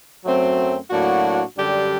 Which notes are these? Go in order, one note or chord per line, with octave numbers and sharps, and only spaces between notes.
F#2 F#3 A3 C4
A2 F#3 A#3 D4 F#4
F#2 D3 G3 D4 G4